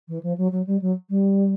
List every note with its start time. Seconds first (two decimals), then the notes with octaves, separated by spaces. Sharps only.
0.08 E3
0.23 F3
0.37 F#3
0.51 F#3
0.67 G3
0.81 F#3
1.09 G3